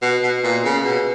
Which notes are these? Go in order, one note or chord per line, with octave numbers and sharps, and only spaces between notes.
B2
B2
A#2
C#3
B2